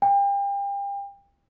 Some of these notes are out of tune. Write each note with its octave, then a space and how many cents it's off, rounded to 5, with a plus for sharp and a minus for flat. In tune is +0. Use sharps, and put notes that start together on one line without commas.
G5 +35